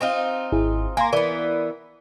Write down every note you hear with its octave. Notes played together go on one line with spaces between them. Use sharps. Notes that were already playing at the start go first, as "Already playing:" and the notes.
C4 D#4 F4
G#1 E4 G#4
A#3 G#5 A#5 C6
E3 B3 A#4 D5